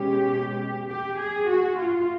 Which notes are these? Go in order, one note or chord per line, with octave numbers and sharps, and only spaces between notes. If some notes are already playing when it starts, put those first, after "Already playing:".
Already playing: B2 G#3 C#4 G4
G4
G#4
F#4
F4